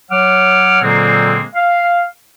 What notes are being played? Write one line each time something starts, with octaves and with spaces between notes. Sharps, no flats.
F#3 C#5 F#5 D6 F6
A#2 D3 F#3 G#3 A#3 C4
F5